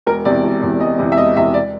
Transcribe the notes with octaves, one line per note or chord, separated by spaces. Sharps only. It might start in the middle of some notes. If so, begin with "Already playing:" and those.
E1 A#4
E2 C3 D5
E1
E2 C3
E1 D#5
E2 C3
E5
E1 D#5
E2 C3 E5
D5